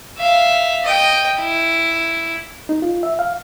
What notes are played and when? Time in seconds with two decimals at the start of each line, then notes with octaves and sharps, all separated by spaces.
0.18 E5 F5
0.84 D#5 G5
1.39 E4
2.69 D#4
2.82 F4
3.03 E5
3.19 F5